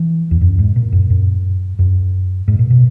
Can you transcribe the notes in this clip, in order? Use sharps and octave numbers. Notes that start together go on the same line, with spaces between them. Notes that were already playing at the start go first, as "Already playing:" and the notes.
Already playing: E3
E2
F#2
G#2
A#2
F#2
F#2
F#2
G#2
A#2
B2